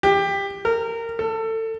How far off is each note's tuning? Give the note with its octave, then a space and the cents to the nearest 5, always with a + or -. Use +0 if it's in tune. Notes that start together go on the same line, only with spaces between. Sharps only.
G4 +20
A#4 -20
A4 +25